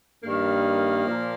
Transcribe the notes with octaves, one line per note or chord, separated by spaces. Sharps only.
G2 D#3 A#3
A#2 F3